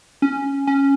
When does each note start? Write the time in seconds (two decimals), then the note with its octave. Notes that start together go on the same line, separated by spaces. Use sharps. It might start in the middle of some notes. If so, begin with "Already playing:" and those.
0.22 C#4
0.67 C#4